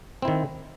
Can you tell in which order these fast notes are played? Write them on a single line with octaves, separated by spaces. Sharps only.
C4 E4 D#3